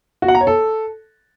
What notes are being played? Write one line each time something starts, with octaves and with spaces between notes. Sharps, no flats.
F#4
F#5
A#5
C#5
A4